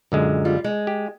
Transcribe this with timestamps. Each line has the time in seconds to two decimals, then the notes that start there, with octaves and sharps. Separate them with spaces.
0.12 F#2 A#2 D3 G#3
0.45 G3 F4
0.64 G#3
0.87 G4